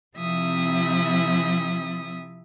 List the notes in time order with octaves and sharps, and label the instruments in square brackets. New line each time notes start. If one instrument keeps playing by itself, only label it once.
[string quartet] C3 F3 C4 E4 E5 D#6